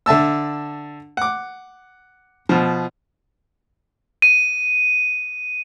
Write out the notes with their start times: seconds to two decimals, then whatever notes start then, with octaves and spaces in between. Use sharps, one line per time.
0.06 D3 E5 A5 E6
1.17 F#5 D6
2.49 B2 F3
4.22 D#7